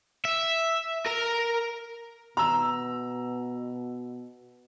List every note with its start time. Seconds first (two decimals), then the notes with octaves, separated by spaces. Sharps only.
0.25 E5
1.06 A#4 A#5
2.37 B2 A#5 E6